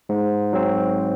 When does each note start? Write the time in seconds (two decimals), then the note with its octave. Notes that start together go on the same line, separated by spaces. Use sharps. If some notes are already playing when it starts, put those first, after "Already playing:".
0.09 G#2
0.53 F#3 C4